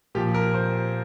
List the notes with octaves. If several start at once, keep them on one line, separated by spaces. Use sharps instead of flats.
A#2 F3 G4
A#4
C5